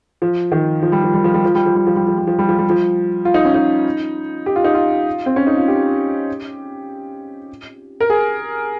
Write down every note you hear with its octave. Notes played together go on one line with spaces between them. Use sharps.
F3
D#3
F3
G3
F3
G3
F3
G3
F3
G3
F3
G3
F3
G3
F3
G3
F3
G3
F3
G3
F3
F4
D#4
C#4
D#4
G4
F4
D#4
F4
C4
C#4
D#4
F4
G4
A#4
G#4